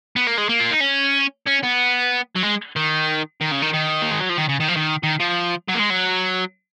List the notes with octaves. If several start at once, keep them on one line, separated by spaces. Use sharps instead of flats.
B3
A#3
G#3
A#3
F4
D#4
C#4
C#4
B3
F#3
G#3
D#3
D#3
C#3
D#3
D#3
A#3
G#3
F#3
F3
D#3
C#3
D#3
F3
D#3
D#3
F3
F#3
A#3
G#3
F#3